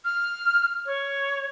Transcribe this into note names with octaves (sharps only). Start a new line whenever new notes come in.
F6
C#5